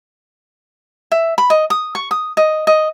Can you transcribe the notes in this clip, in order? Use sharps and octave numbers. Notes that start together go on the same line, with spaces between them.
E5
B5
D#5
D#6
C#6
D#6
D#5
D#5